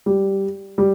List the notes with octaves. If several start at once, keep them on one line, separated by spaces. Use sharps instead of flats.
G3
G3